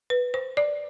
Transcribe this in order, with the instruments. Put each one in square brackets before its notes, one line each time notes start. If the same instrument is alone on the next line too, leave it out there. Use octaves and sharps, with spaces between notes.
[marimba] B4
C5
D5